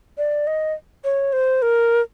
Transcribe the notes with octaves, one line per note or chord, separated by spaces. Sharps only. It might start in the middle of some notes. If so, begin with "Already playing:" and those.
D5
D#5
C#5
C5
A#4